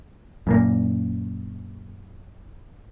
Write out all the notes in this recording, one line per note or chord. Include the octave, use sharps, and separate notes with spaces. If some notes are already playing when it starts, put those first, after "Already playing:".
F#2 A#2 A#3